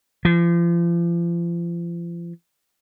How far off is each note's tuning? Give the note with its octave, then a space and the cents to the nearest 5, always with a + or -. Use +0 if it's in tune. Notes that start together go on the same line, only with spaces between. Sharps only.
F3 -35